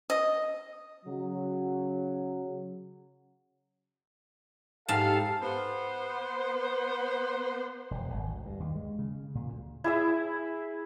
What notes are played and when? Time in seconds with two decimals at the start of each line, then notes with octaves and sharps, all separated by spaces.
0.10 D#5
1.06 C#3 F#3
4.88 G#2 G4 A4 F5 A5
5.42 B3 C5
7.91 E1
8.14 G#1
8.28 D2
8.46 G2
8.60 D#2
8.76 G#3
8.98 C#3
9.35 A#2
9.48 D2
9.84 E4 G#4 E5